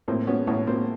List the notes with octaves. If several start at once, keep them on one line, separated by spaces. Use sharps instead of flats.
A2 A#3 C4
B3 C#4
A2 B3 C#4
A#3 C4